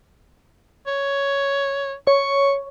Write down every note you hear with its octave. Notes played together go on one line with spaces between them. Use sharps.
C#5
C#5 C#6